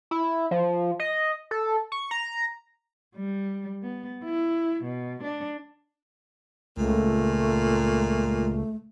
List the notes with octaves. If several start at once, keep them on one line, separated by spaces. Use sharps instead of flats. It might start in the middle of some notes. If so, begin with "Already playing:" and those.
E4
F3
D#5
A4
C#6
A#5
G3
B3
E4
B2
D4
C#2 A#2 A3